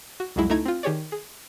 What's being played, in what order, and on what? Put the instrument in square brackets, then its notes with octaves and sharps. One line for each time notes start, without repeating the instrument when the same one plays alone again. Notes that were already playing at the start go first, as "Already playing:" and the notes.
[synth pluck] F#4
C2 F2 F#3 G#3 E4
C#2 A3 D#4 E4 A#5 G#6
C4 F4
D#3 G4 G#4 C#5 D5
G#4